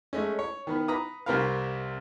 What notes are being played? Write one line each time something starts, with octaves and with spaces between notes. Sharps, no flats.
G#3 A3 C#4
C#5
D#3 B3 B4
B4 A#5 D#6
C2 C3 C4 A#4 B4 F5